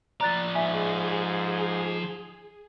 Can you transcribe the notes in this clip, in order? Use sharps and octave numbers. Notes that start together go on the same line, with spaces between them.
F3 D5 A#5 F#6 A6
G#2 G#4 E5 G#5